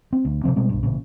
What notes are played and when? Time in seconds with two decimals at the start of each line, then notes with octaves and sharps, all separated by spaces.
0.13 C4
0.25 D2
0.44 C3 D#3 F3 C4
0.56 B2 G3 G#3 C4
0.69 B1 G2
0.83 A1 A#2 C#3